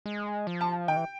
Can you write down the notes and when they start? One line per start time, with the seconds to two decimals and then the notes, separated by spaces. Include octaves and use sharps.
0.06 G#3
0.47 F3
0.61 A5
0.88 D#3 G5
0.96 E3